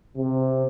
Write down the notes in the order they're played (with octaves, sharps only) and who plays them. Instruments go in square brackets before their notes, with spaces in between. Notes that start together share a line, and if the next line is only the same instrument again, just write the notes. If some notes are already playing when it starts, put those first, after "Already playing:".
[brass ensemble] C3